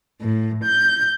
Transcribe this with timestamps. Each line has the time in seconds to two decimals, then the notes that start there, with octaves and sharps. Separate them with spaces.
0.21 A2
0.63 G6